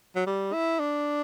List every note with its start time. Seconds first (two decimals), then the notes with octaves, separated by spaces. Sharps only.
0.15 F#3
0.27 G3
0.53 E4
0.80 D4